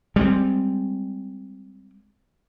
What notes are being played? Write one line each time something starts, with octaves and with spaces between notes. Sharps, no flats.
G3 G#3 B3 C4